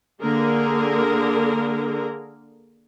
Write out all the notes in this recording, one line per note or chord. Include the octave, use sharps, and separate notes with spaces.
D3 A#3 G#4 A#4